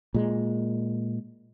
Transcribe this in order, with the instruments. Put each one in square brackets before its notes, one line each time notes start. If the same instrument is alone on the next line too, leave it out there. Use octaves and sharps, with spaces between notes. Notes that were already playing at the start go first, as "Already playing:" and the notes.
[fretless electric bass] A#2 G#3